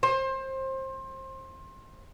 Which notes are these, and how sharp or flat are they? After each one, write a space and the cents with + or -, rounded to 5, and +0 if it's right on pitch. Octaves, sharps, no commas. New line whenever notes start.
C5 +25